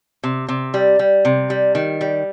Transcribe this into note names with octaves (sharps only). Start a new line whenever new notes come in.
C3
C3
G3
G3
C3
G3
D#3
G3